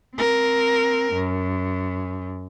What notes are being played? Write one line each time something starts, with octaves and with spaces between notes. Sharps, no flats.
C4 A#4
F#2